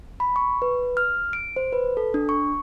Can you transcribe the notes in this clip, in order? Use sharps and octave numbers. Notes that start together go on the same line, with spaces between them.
B5
C#6
B4
F6
D7
C5
B4
A4
D4
C#6